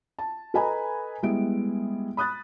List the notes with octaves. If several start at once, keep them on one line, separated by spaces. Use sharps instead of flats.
A5
A4 B4 D#5 G#5 A#5 B5
G3 G#3 B3 E4 D7
B5 D#6 F#6 A6